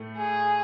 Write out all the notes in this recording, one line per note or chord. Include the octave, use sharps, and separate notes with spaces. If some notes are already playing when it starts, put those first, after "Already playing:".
Already playing: A2 A3
G#4